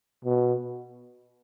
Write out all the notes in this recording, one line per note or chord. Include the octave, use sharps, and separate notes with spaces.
B2